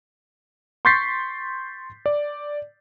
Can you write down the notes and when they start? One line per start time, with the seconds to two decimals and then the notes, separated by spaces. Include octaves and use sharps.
0.85 C6 C#6 G6 A6 B6 C7
2.06 D5